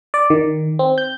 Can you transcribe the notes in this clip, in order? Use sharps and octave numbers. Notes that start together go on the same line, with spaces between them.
D5
D#3
C4
G6